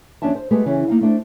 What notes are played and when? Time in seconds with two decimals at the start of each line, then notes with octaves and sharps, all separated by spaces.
0.22 D#2 F3 C#4 D4 E5 A5
0.35 C5
0.51 G#3 A3 B3 G4 B4
0.66 C#3 E3 C#4
0.88 A#3 D#4 F5
1.01 A3 D4 C5